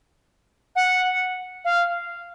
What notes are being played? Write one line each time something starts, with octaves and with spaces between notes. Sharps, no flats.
F#5
F5